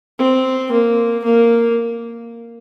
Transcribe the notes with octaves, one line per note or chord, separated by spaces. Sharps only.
C4
A#3
A#3